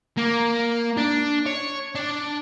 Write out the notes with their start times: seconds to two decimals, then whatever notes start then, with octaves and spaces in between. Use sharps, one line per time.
0.18 A#3
0.97 D4
1.46 C#5
1.95 D4